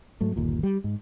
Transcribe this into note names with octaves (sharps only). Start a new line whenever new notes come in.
G#2 F#3 A3
G1 D#2 A#2
G3
G#2